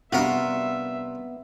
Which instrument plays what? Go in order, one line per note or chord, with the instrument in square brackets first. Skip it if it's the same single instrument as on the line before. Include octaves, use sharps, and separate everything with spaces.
[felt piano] C3 G3 D4 [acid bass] B3 [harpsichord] F4 F#4 A#4 [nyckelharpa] E5